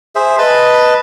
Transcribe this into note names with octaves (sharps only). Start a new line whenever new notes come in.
G#4 C5 E5
B4 D#5 A5 B5